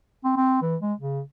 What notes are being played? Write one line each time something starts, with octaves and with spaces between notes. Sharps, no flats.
C4
C4
E3
G#3
C#3